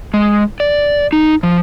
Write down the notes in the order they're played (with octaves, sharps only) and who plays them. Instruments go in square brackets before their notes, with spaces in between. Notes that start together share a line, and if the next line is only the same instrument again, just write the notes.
[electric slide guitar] G#3
D5
D#4
F3